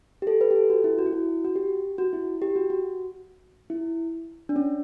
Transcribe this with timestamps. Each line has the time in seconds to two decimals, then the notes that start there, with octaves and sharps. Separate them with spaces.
0.22 G4
0.27 A4
0.41 B4
0.51 G4
0.56 A4
0.70 F#4
0.84 E4
0.98 F#4
1.06 E4
1.12 F#4
1.45 F#4
1.56 G4
1.98 F#4
2.13 E4
2.42 G4
2.56 F#4
2.70 F#4
3.70 E4
4.49 D4
4.56 C#4